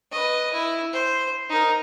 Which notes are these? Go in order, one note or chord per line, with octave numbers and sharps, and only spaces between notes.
B4 D#5
E4
C5
D#4 A#4